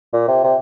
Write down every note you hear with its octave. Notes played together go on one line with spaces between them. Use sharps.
A#2
C3
C3